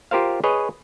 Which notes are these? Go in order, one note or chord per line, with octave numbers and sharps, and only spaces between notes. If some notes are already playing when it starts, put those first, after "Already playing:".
F4 G4 A#4 C5 F5
G#4 B4 C#5 D#5